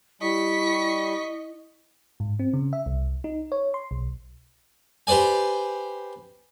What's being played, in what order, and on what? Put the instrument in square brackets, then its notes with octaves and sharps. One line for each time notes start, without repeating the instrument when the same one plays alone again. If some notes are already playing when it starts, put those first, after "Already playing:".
[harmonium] G3 [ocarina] E4 [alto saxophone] D#5 [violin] C#6 B6
[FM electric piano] G#2
C4
C#3
E5
C2
D#4
C#5
C6
B1
[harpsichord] G4 B4 C5 D5 G#5